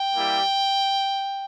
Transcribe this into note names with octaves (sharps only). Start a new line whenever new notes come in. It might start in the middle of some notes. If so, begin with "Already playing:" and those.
Already playing: G5
G3 A#3 E4 G4